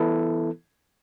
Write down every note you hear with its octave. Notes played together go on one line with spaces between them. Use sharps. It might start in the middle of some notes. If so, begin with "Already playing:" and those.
Already playing: E3 B3 E4 A4